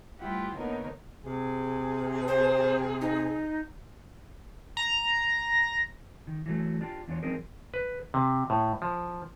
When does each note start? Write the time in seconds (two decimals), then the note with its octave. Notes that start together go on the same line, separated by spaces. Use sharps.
0.19 D2 G3 E4 F4 G4 F#5
0.57 D3 A#3 B3 D#4 A#4 C#5
1.25 C3 G#4
2.28 C5
3.01 D#4
4.77 A#5
6.27 D#3
6.46 E3 F#3 A3
6.81 D4 F4 G4
7.08 E2 D4 F4 C#5
7.23 F3 C4 C#4 D#4 G#4 A#4
7.74 B4
8.14 C3
8.50 A2
8.82 F3